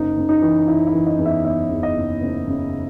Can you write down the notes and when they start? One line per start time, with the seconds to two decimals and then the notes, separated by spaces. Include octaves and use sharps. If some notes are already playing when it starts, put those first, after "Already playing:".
Already playing: F#1 D#4
0.17 F#1
0.29 D#4
0.42 E3
0.67 E3 E4
0.87 E4
0.94 E3
1.06 D#5
1.19 E2
1.25 E5
1.44 F#1 E5
1.70 E2
1.83 D#5
1.96 F#1
2.21 F#1
2.47 C#3